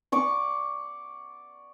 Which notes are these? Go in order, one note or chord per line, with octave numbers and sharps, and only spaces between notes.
D5 C#6 D6